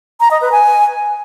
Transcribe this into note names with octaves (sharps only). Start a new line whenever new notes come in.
A#5
D#5
B4
G#5